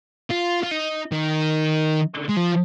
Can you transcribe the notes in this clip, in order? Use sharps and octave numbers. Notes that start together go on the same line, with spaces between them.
F4
F4
D#4
D#3
G#3
F3